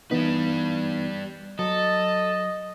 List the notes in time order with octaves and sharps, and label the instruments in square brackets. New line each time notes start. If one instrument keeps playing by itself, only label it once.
[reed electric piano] E3 B3 D#4 [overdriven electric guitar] G3 B4
[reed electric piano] F#3 [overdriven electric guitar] A4 [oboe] D#5